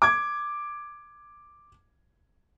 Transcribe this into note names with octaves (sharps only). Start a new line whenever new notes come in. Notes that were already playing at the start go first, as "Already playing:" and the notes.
D6 G#6